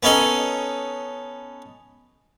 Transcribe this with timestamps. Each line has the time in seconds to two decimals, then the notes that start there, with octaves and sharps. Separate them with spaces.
0.03 B3 C#4 D#4 A4